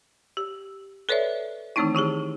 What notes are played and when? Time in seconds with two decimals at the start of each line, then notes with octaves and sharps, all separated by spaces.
0.37 G4
1.09 A4 B4 C#5 D5 E5
1.76 D#3 E3 A3 C4 D#4 E4
1.94 D#3 E4 G4 G#4